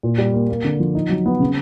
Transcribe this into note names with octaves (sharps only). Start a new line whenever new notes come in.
A#2
G3
A#3
A#3
D3
F3
D#4
F#3
B3
C#3